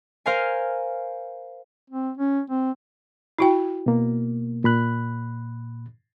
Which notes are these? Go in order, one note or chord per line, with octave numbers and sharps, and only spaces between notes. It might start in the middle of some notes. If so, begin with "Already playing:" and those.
A#4 C5 F5 G#5
C4
C#4
C4
E4 F#4 G5
B2 A#3
A#2 B5 F#6